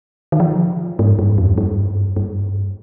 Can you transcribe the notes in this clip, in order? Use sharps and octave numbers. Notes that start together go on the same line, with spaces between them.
D#3
F3
G#2
G2
F2
G2
G2